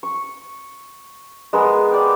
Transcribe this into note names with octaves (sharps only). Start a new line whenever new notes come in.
C#6
G#3 B3 A#4 E6
D5 G5